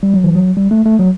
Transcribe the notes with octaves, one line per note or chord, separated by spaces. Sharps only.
G3
F#3
E3
F#3
G3
A3
A3
F#3